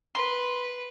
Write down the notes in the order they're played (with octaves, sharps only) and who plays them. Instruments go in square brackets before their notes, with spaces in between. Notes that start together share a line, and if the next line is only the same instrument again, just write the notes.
[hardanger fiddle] B4 [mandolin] C6